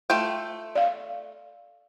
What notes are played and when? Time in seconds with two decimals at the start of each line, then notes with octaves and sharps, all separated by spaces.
0.10 A3 F4 G5
0.75 D5 F5